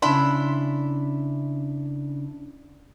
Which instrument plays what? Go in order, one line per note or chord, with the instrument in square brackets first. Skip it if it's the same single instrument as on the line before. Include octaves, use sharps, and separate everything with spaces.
[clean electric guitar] C#3 E4 [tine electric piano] D4 [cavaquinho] E5 B5 C6